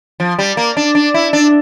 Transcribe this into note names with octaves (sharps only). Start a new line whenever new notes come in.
F3
G3
A#3
D4
D4
E4
D4